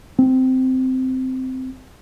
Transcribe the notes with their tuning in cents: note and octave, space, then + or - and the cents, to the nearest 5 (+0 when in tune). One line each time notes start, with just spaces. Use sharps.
C4 -15